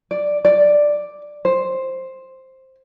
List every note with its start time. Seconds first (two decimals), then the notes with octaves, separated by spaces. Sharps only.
0.11 D5
0.45 D5
1.45 C5